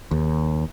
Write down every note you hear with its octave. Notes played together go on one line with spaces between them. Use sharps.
D#2